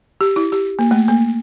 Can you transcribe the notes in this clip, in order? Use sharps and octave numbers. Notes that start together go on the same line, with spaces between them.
G4
E4
G4
A#3
A3
A#3